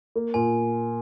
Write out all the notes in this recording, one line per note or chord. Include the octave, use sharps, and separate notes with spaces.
A#3
A#2 G#5